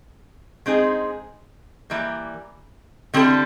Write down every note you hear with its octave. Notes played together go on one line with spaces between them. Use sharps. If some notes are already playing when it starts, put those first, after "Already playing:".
G#3 C4 D#4 G#4
E3 G3 A#3
D3 G3 C4 E4 A4